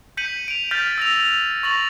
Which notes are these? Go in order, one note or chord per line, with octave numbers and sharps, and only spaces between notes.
G6 B6 C#7 D#7 F#7
D7 F7
F6 G6 A6 B6
E6 A#6 F7
F7
C#6 A6 A#6 F#7